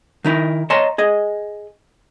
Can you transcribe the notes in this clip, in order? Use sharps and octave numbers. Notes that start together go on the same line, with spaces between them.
D#3 D#4 E4 A#4
C#5 D#5 A5 A#5 C6
G#4 D#5